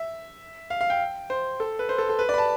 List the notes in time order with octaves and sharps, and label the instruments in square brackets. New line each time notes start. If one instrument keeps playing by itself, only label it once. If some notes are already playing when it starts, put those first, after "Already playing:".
Already playing: [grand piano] E5
F5
F5
G5
C5
A4
B4
C5
A4
A4
B4
D5
B5
A5